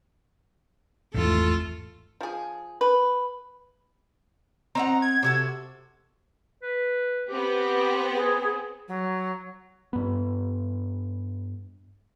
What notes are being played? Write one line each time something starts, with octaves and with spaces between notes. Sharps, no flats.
G#1 E2 A3 F4 A4
F3 G#4
B4
C4 D#4 F#5 A#5
G#6
C3 F#4 A4
B4
B3 C4 G4
G#4
F#3
G2 B3